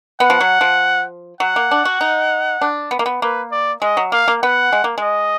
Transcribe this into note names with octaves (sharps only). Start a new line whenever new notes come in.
B3 F#5
F3
F#3
F3
F#3 F#5
A#3
D4
F#4
D#4
D4
B3
A#3
B3
A#3 B4
D5
G#3 D#5
F#3
A#3 F5
A#3
B3 F#5
G#3
A#3
G#3 D#5